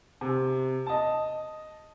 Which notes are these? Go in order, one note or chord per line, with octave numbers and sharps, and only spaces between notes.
C3
D#5 A5